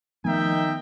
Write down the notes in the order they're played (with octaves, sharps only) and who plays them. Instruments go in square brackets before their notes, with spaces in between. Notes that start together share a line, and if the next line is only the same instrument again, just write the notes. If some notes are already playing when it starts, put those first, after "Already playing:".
[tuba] D#3 [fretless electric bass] F3 A3 B3 [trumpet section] D#4 E5 G5